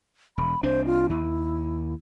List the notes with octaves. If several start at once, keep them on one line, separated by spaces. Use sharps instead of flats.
E1 B5
C2 C4 D4 C5
F4
D#2 E4